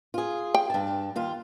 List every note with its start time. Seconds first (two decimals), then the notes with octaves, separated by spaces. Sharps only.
0.14 F4 G#4
0.54 G5
0.70 G2 A5
1.16 D#2 F4